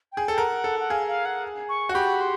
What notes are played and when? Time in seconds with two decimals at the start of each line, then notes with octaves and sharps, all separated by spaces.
0.12 G5
0.17 G#4
0.28 A4 G5
0.38 A#4 F#5
0.64 A4
0.80 F#5
0.90 G#4 F5
1.08 F5
1.25 F#5
1.69 C#6
1.89 F#4
1.95 G4 B5
2.21 C6